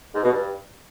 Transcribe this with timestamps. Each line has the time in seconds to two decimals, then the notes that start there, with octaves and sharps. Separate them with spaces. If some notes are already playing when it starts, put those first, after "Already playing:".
0.13 G#2
0.23 B2
0.33 G2